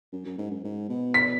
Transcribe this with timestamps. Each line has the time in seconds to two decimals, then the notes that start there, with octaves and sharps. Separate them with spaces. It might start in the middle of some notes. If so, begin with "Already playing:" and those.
0.13 F#2
0.26 F#2
0.38 G#2
0.51 F#2
0.64 G#2
0.89 B2
1.14 B6